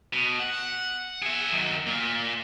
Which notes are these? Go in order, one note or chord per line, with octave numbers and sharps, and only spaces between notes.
B2
F#5
G#4 E5
D#3 F#3
A#2 A#3